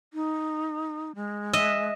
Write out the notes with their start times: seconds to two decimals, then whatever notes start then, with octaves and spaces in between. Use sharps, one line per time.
0.14 D#4
1.15 G#3
1.53 D#5 E5